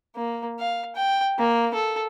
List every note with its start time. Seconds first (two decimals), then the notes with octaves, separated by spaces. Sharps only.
0.16 A#3
0.59 F5
0.96 G5
1.39 A#3
1.74 A4